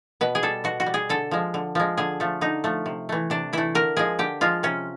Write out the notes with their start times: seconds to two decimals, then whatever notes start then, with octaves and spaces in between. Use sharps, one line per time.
0.21 B2 B4
0.35 G#4
0.43 G3 A4
0.64 B2 F#4
0.80 F#4
0.86 G3
0.94 G#4
1.09 D3 A4
1.31 F3 G#3
1.54 D3
1.75 F3 G#3
1.97 D3 G#4
2.20 F3 A3
2.41 D3 D#4
2.64 F3 A3
2.86 C3
3.09 E3 A3
3.30 C3 D4
3.53 E3 A3 E4
3.75 D3 A#4
3.97 F3 G#3 G#4
4.19 D3 G4
4.41 F3 G#3 F4
4.63 C3 C#4